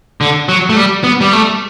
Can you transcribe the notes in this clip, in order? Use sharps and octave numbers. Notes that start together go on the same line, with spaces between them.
D3
F#3
A3
G3
B3
G3
A3